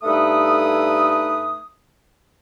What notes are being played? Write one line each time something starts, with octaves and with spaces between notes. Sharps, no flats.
G2 A3 D#4 A4 B4 D#6